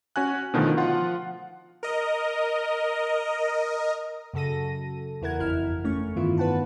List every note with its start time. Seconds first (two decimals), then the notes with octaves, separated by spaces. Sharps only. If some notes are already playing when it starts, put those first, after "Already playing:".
0.16 C#4 F#4 G#5 F#6
0.54 B2 D3 D#3 F3 A3 B3
0.77 F3 F4 F#5
1.83 A#4 D#5
4.34 F#2 C#3 F#4 A4 A#6 D#7
5.22 E2 E4 A#4 F#5 G#6
5.39 G1 F2 E4 F6
5.84 A3 C#4 C#6
6.16 G2 D#3 E3 B3 E4 F4
6.37 B4 F#5 A5